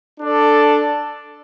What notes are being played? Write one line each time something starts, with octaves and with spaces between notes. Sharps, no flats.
D4 A4 D5